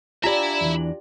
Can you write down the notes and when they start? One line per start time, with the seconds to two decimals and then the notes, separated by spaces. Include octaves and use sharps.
0.24 D4 F4 G4 D5 E5 G#5 A#5 B5
0.61 E2 E3